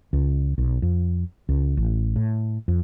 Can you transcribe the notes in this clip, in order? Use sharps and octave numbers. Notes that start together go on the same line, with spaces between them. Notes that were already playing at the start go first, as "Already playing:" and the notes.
C#2
B1
F2
C#2
A1
A2
F2